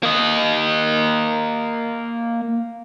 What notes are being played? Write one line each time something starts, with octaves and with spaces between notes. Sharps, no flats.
A#3 D#5